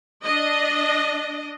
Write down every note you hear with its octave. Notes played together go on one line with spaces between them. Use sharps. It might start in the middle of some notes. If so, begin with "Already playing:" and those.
D4 D#5